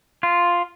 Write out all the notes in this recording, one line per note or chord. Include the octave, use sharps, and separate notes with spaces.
F4